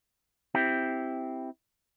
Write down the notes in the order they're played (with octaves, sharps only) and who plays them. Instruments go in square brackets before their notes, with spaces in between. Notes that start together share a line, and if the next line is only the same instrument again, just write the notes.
[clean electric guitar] C4 E4 G4